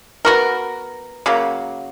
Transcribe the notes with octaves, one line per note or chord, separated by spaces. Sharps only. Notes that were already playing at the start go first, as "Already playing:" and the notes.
B3 F#4 A#4
C#3 F#3 A#3